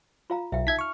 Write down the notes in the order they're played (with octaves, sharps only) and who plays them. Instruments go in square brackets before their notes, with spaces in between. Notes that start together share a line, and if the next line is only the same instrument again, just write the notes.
[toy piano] F4 F5 A#5
[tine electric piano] B1 [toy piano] E5 F5 G5
[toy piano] D#4 [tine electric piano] E5 G#6 B6
[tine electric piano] C#6 F6